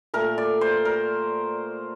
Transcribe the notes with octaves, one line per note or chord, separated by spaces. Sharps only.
A#2 A3 A#4
D5
C5
A#4